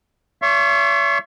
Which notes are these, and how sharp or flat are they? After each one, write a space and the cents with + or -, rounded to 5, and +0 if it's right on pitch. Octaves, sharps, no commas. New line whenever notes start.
C#5 +45 E5 +40 C#6 -35